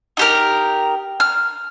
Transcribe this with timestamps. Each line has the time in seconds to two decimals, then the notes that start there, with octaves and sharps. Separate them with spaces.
0.17 D#4 G4 A#4
1.20 F6